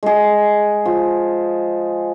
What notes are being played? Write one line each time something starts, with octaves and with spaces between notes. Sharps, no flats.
G#3 G#4
F3